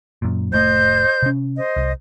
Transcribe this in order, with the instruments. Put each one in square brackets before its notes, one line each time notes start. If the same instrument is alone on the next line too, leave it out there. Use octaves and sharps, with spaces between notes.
[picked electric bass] F#2 A#2
[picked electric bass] F1 A2 A3 [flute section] C5 D#5 G6
[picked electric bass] C3 C#4
[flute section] C5 D#5
[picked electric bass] C2